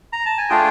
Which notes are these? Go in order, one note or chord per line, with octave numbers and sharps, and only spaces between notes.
A#5
A5
G#5
A3 D4 F4 G#4 G5